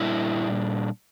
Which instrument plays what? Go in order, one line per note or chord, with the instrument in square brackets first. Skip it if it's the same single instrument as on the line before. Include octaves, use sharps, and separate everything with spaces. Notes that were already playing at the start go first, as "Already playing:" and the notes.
Already playing: [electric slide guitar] A#2 G3 D4 E4